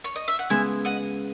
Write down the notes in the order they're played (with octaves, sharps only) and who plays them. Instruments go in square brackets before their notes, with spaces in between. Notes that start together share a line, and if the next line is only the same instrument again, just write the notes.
[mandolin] C#5
D#5
E5
F#5
[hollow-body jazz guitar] C#3 G#3 B3 [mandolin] E5 G#5
[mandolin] D#5 F#5